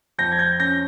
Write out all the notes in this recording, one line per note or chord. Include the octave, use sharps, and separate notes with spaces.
F2 G6 A#6
G#6
G6 A#6
C#4 G6 A#6